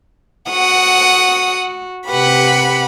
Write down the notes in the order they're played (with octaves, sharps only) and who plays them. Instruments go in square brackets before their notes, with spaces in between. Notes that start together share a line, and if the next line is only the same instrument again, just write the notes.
[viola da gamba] F#4 [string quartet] F#5 D#6
[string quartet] C3 F#5 B5 [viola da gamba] G4 B4